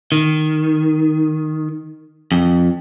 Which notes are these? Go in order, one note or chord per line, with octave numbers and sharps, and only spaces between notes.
D#3
F2